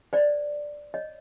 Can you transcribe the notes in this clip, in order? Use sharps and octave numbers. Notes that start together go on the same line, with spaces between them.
C5 D5
C#5 D#5